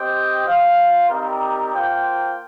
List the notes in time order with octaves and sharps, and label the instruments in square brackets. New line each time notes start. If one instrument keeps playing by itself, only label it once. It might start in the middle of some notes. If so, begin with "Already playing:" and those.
Already playing: [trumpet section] C4 G4 C5 D#5 G5
F4 C5 F5
G3 C4 D#4 G4 A#4
A#3 F4 C5 G5